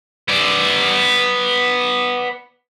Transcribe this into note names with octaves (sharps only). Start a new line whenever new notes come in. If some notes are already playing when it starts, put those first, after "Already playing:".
B3 D5